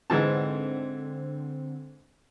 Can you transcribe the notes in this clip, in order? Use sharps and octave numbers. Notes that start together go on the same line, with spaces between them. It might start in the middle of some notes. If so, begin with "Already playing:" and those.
G#2 D3 E3 C4 A5